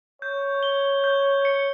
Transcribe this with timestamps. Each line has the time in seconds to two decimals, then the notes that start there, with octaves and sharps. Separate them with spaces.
0.22 C#5 G6
0.63 G7
1.04 G6
1.45 C#7